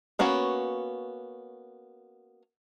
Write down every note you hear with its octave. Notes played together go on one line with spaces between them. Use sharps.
A#3 B3 C#4 F#4 C#5